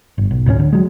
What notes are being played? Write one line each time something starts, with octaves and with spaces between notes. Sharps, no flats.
G1
B1
D2 A2 B3 C#4
D3
F#3 G#3